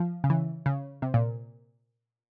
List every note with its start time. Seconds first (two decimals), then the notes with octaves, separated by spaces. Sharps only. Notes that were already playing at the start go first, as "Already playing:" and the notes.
Already playing: F3
0.24 C#3
0.30 E3
0.66 C#3
1.02 C3
1.14 A#2